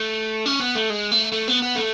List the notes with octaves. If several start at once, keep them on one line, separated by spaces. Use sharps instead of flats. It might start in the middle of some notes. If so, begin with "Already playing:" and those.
Already playing: A3
C#4
B3
A3
G#3
A3
A3
B3
B3
A3